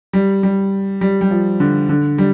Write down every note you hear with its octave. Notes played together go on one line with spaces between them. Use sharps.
G3
G3
G3
G3
F3
D3
D3
G3